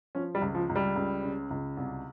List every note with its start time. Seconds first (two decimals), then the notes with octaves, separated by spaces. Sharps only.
0.15 F3 C#4
0.35 G3
0.41 C#2
0.55 F3
0.69 C#2
0.76 G3
0.96 C#2
1.23 C#3
1.50 C#2
1.77 C2